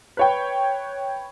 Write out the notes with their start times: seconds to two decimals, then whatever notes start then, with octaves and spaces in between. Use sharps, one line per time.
0.17 B4 C#5 G5